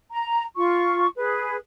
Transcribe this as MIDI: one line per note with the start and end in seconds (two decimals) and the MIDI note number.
0.11 0.43 82
0.56 1.08 65
0.56 1.08 85
1.16 1.56 68
1.16 1.56 71